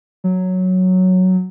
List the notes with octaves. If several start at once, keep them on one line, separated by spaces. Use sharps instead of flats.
F#3